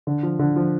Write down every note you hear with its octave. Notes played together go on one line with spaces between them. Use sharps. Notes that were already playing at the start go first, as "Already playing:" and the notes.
D3
F3
D3
F3